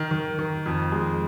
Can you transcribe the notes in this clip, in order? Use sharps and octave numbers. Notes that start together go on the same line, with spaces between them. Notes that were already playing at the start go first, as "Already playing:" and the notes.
Already playing: D#3
D#3
D#3
F2
G#3